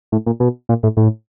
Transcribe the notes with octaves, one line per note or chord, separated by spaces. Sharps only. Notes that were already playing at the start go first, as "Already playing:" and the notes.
A2
A#2
B2
A#2
A2
A2